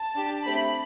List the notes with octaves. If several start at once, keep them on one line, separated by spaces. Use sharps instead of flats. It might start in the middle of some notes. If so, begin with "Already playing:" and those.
Already playing: A5
D4 G4
A3 C4 G4 B5